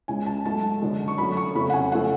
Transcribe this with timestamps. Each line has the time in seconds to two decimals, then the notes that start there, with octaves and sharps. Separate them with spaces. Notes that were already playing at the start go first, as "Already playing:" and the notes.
0.08 C#2 C#3 G#3 G#5
0.26 A5
0.45 G#2 F#3 A3 A5
0.81 F#2 D3 G#3
1.08 C#6
1.18 F#2 D3 F#3 A3 B5
1.37 C#6
1.55 F2 C#3 F#3 A3 B5
1.70 F#5
1.73 G#5
1.92 C#3 F3 A3 F#5